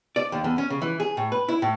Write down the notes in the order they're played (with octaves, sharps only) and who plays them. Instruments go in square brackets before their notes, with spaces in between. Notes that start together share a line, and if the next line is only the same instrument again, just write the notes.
[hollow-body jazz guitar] D5
D#2
E2
C#4
C#3
E3
G#4
A2
B4
E4
A2